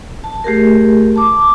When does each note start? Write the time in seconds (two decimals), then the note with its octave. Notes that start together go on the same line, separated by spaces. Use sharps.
0.24 A5
0.44 A3 G4 G#4 A#4
1.16 A5 D6